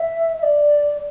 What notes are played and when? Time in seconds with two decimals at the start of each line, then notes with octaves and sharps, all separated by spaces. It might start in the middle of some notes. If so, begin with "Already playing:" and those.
Already playing: E5
0.38 E5
0.43 D5